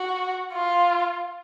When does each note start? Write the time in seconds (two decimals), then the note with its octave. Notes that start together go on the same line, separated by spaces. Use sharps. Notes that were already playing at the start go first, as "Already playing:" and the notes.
Already playing: F#4
0.53 F4